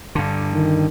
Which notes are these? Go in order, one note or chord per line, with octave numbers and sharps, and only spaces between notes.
G2 D3
D#3